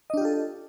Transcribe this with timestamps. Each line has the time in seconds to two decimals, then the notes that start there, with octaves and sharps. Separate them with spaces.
0.10 D#5
0.14 D4
0.17 G4
0.21 F4
0.25 A4